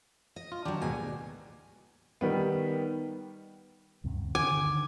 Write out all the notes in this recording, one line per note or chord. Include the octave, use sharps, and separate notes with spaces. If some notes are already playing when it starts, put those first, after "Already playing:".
D#5
F4
D#3 F#3 D4 G4
D#2 G#2 B2 G#5
D#3 G3 B3
D2 G2 C3
D3 D#3 G#5 D6